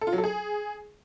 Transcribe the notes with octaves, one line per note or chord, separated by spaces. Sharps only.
A4
F4
F#3
A4
G#4